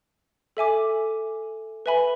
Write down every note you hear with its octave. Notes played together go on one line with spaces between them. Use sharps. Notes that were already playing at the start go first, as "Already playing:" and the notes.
A4 E5 G#5 D6
B4 E5 G#5 B5